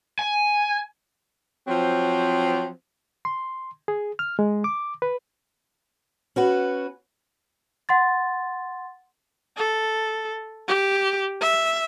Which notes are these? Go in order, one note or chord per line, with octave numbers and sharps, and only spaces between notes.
G#5
F3 F#3 C4
C6
G#4
F6
G#3
D6
B4
C#4 F#4 B4
F#5 C6 A6
A4
G4
E5